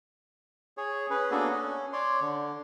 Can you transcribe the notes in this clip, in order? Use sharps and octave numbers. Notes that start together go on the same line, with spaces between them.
G#4 C#5
C#4 G#4 B4
A#3 B3 D4 F#4 G#4 A4
C#4
C#5 D5 C6
D3